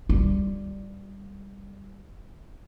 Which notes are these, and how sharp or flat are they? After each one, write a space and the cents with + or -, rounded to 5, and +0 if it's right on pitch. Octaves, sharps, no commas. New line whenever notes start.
G3 +5 F4 +0